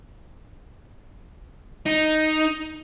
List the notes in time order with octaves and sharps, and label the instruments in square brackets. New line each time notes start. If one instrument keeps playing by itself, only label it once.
[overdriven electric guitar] D#4